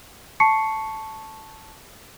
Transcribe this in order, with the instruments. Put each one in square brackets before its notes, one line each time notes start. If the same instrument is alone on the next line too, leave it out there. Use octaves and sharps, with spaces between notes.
[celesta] A5 C#6 C7 C#7